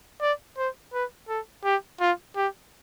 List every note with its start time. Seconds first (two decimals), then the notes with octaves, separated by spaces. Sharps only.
0.21 D5
0.57 C5
0.93 B4
1.29 A4
1.65 G4
2.00 F4
2.36 G4